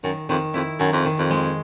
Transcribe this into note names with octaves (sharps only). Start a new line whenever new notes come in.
F#2 D#3
F2 D#3
F2 E4
F#2 D#3
F2
D#3
F2
G#3